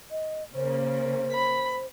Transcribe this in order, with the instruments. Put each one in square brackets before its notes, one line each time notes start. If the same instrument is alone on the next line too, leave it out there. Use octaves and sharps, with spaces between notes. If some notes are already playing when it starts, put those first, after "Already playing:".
[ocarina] D#5
[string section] C#3 A#3 [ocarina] C5
[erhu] B5